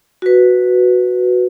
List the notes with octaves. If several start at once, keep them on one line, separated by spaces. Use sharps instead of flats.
F#4 B4